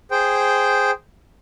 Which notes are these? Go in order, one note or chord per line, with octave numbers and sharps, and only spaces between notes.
G#4 C5 G5